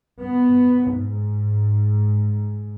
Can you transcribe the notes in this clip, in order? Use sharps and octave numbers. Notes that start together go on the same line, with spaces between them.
B3
G#2